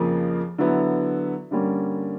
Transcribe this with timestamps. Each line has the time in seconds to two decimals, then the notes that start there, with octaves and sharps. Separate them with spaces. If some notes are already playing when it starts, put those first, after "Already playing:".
Already playing: F2 C#3 F3 A#3
0.58 D3 F#3 B3 E4
1.51 G2 D3 G3 A#3 C#4